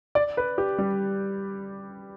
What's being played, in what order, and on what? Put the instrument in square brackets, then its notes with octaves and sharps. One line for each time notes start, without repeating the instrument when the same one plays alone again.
[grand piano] D5
B4
G4
G3